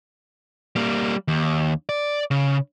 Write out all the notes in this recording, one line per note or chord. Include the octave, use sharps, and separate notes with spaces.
G3 A#3
D#2
D5
C#3